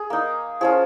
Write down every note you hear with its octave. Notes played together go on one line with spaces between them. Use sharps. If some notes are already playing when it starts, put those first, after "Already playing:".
Already playing: G#4
A#3 D#4
F3 C#4 F4 G#4